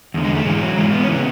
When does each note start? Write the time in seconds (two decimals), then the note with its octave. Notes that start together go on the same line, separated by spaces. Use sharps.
0.14 E2 D3
0.24 G#3
0.35 A3
0.45 G#2 E3 G#3
0.61 F#3
0.76 G#2 E3 G#3
0.93 B3
1.03 C#4
1.08 C#3 E3 B3